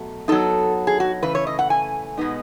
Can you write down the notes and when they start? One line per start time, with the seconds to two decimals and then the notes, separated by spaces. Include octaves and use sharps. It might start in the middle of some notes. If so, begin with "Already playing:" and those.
Already playing: B2 F#3 A3
0.28 F#3 B3 D#4 A4
0.87 G#4
1.00 F#4
1.22 C#3 E3 A3 B4
1.35 C#5
1.47 D#5
1.59 F#5
1.70 G#5
2.17 B2 G#3 B3 D#4